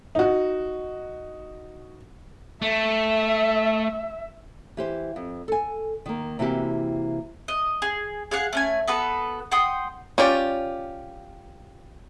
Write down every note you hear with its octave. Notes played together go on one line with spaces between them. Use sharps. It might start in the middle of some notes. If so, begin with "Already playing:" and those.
D#4 F#4
A3 E5
E3 G4 C5
F2
A4 G#5
D#3 A#3
C3 E3 A#3 E4 F#4 G4
D#5
G#4
G#4 F5 F#5
A3 C#4 G#5
B3 F#4 A4 B4
F#5 G5 C6 D#6
C#4 F4 G4 D5